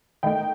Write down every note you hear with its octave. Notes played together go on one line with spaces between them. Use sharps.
D#3 A3 D#4 G5